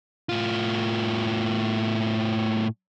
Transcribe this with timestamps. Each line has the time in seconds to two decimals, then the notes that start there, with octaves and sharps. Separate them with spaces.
0.29 A2 F4